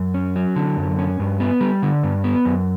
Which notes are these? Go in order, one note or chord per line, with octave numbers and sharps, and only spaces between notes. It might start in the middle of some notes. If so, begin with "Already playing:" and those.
Already playing: F#2
C#4
F#3
D3
F#2
C#4
G2
B3
G3
D3
G2
B3
F#2